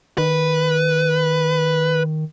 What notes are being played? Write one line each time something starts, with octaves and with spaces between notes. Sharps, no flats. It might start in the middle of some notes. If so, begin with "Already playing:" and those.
D#3 B4